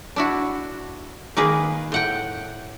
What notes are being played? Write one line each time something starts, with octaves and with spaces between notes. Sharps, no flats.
D4 E4 F#4
D#3 A#3 G#4 B4
A2 F#5 G5